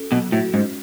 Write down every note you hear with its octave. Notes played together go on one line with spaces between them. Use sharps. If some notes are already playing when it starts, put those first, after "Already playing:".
Already playing: C#4 F#4 A4
B2 F#3
A2 F#4
G#2 C#4